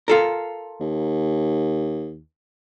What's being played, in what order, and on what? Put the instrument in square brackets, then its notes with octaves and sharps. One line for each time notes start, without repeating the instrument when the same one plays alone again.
[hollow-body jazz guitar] F4 A4 A#4
[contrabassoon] D#2